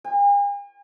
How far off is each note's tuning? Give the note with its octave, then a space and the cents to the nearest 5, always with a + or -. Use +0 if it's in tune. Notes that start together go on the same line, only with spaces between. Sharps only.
G#5 -45